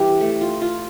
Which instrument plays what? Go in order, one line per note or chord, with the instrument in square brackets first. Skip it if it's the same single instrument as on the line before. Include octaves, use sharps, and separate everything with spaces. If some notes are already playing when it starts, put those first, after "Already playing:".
Already playing: [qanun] E3 [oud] G4
[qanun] A3
F4
F4